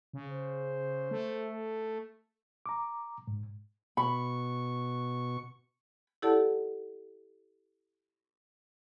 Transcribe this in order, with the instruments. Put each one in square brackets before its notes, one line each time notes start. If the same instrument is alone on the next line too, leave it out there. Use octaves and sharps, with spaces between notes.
[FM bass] C#3
[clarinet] C5
[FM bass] A3
[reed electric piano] A#5 D6
G#2
[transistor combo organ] B2 C#6 [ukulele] B5
[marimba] E4 G4 A4 D5 F#5 A5